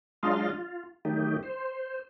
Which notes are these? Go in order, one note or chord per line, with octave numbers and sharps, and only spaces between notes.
F#3 G#3 D4 F4 D#5 F5
F4
D#3 F#3 A3 D#4 G4
C5